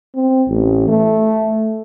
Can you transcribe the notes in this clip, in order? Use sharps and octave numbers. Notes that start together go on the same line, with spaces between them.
C4
A1
A3